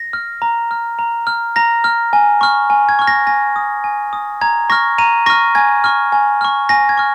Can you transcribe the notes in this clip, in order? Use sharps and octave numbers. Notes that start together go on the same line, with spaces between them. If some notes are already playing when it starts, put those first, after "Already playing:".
Already playing: A#6
F6
A#5
F6
A#5
F6
A#5 A#6
F6
G#5
C#6 F6
G#5
G#6
C#6 F6
A#6
G#5 A#6
D#6
G#5
D#6
A#5 G#6
C#6 F6 A#6
A#5 D#7
C#6 F6 A#6
G#5 G#6
C#6 F6
G#5
C#6 F6
G#5 A#6
G#6
C#6 F6